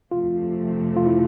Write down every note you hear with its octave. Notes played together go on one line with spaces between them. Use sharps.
F2 C3 F3 A3 F4
F4
E4